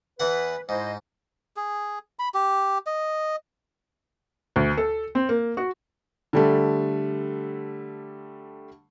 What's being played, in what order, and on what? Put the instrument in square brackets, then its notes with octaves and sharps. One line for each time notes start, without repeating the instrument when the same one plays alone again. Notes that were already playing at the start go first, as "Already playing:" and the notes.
[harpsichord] E2 E3 F#5 [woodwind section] B4
[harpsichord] G#2 [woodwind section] E4 C5 D#5
[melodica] G#4
B5
G4
D#5
[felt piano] D2
A4
C4
A#3
F#4
D3 G3 A3